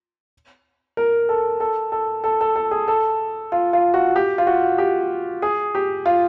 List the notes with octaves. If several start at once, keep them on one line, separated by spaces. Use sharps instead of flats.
A#4
A4
A4
A4
A4
A4
A4
G#4
A4
F4
F4
F#4
G4
F4
F#4
G4
G#4
G4
F4